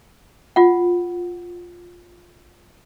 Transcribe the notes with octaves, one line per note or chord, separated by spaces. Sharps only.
F4 F#5